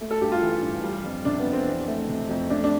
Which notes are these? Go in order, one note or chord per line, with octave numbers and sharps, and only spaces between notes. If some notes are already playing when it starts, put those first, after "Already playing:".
A3
A4
G2 G4
F4
E3
G2
G3
F2
C3 D4
B3
F2
C4
E3
A3
C3
F2
A3 D4
D4